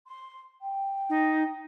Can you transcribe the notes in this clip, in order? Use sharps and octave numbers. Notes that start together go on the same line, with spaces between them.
C6
G5
D#4